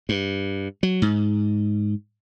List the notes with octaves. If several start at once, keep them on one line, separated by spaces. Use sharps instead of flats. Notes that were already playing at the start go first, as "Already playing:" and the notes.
G2
F#3
G#2